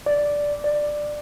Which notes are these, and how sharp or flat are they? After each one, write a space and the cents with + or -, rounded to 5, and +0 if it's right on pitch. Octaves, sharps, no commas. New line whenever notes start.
D5 -5
D5 +10